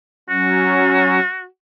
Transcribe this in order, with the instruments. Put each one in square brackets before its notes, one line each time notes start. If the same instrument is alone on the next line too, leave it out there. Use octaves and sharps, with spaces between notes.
[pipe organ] F#3 C#4 [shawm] F#4